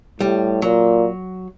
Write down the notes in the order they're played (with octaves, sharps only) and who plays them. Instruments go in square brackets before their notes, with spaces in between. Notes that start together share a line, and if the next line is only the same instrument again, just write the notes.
[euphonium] A2 [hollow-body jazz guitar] G3
[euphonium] A#2 [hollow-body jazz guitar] F#3